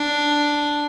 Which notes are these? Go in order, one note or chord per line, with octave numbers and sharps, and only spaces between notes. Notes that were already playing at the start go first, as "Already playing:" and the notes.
Already playing: D4